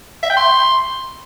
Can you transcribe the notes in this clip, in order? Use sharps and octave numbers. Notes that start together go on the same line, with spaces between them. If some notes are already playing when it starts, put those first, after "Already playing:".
E5
G5
C6